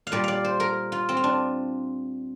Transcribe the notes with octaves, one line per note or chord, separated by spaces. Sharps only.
F5
A#2 G3 D5
D5 F5
C5
A#4
F4
C4
F4
D4